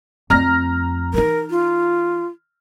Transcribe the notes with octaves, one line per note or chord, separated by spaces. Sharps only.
F2 A3 A#5 F6 A#6
E3 D#4 A#4
F4